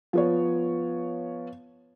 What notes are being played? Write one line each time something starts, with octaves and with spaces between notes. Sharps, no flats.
F3 B3 C#5